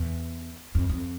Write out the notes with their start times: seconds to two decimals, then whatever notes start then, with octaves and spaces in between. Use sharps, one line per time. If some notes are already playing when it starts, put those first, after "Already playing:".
Already playing: E2
0.75 F2
0.89 F2